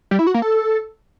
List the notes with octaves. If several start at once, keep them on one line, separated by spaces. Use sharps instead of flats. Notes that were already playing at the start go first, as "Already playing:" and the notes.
G3
E4
F#4
A#3
A4